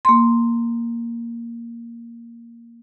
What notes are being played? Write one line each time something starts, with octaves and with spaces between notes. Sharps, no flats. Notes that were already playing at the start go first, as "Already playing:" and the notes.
A#3 C6